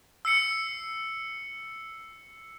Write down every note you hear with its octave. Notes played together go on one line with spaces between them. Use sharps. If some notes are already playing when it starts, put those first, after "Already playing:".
E6 C7 C#7